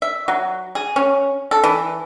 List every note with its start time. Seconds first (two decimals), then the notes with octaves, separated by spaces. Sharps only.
0.02 E5
0.28 F#3
0.75 G#4
0.96 C#4
1.51 A4
1.64 E3